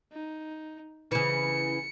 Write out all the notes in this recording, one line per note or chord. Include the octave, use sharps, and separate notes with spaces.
D#4
C#3 E3 C#7